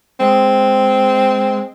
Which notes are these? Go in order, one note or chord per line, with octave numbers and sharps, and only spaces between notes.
G#3 C4